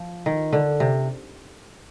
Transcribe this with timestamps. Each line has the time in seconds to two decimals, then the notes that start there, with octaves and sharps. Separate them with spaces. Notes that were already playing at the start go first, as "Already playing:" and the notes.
Already playing: F3
0.26 D#3
0.53 D3
0.80 C3